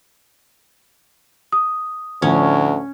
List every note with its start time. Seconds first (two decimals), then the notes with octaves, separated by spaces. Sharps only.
1.52 D#6
2.22 D2 A2 D3 F3 C#4